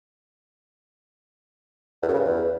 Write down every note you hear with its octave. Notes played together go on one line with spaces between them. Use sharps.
E2
F#2
C#3
G2
E2